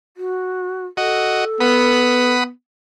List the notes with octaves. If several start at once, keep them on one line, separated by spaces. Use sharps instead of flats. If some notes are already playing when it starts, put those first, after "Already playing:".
F#4
F#4 A4 D#5
B3 F#5 B5 D#6